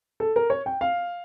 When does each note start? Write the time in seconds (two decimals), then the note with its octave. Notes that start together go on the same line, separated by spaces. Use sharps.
0.20 A4
0.36 A#4
0.50 C#5
0.66 G5
0.81 F5